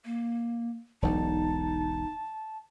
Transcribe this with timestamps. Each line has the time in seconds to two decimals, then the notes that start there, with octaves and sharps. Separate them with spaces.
0.05 A#3
1.02 E1 B1 D#4 A5